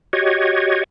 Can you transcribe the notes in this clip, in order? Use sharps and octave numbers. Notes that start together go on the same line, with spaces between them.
F#4 G4 C#5 D#5 G#6